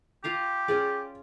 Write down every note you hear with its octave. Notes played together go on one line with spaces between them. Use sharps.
F4 G4 F5 A#5
C#4 F4 G#4 D5